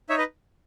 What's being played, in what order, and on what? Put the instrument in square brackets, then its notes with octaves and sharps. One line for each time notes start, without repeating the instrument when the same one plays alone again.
[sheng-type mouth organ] D#4 C#5 E5
B4 D#5